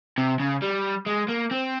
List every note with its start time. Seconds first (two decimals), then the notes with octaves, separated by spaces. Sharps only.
0.18 C3
0.40 C#3
0.62 G3
1.07 G#3
1.29 A#3
1.51 C4